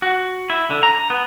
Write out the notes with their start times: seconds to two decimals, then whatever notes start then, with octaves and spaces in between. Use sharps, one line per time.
0.02 F#4
0.50 E4
0.70 D3
0.83 A#5
1.10 B3